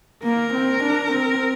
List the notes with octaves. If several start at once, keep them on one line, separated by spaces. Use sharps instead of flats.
A#3 A#4
C4
D4
C4